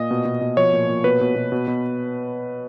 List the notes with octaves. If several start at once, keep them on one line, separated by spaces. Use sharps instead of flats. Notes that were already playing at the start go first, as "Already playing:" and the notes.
Already playing: A#2 D#5
B2
B2
B2
F3 C#5
A#2
A#2
B2 B4
B2
B2
B2
B2